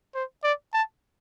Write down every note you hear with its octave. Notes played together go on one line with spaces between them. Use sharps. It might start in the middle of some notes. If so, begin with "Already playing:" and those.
C5
D5
A5